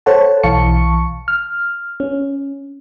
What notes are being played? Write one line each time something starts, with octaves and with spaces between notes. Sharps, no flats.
A4 C5 C#5 F#5 A5
B1 E3 F5 A5 C#6 C#7
F6
C#4